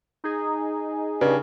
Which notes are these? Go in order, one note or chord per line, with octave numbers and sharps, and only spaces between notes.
D#4 G#4
G2 C#3